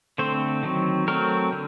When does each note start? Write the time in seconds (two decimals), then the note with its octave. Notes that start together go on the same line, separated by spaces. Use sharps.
0.18 D3 A3 C4 C5
0.63 D#3 F#3 C4
1.08 F#3 A3 C4 A#4
1.52 D3